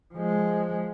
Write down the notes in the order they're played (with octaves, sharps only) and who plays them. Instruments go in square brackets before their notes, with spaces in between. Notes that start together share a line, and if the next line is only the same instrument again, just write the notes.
[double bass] F3 G#3